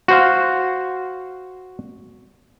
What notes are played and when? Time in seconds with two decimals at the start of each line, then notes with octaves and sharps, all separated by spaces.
0.08 F#4 C5 F5